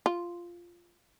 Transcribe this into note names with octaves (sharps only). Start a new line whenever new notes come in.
F4